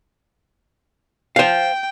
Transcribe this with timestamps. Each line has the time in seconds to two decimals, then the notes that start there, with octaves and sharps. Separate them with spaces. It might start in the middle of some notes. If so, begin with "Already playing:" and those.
1.36 C5 F5 G5